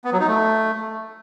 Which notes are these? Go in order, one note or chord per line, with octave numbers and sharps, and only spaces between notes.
B3
F#3
D#4
A3